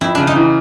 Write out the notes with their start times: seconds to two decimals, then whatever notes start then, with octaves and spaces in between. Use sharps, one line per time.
0.01 F2 E4
0.15 C#3 D4
0.27 D#4
0.36 E3